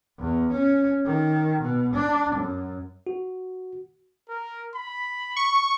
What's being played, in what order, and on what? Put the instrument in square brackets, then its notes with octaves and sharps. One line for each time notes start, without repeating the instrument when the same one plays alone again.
[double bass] E2
C#4
D#3
B2
D4
F#2
[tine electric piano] F#4
[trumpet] A#4
B5
[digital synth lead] C#6